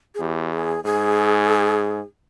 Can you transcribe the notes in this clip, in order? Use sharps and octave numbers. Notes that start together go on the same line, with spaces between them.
G#4
E2 G4
G#4
G#2 G#4